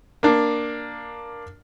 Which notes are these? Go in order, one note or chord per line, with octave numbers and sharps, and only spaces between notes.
A#3 D4